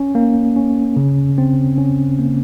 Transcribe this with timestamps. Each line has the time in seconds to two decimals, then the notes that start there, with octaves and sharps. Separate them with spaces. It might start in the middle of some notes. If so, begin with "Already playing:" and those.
Already playing: C#4
0.15 A#3
0.56 C#4
0.96 C#3
1.38 C4
1.78 C#4
2.19 A#3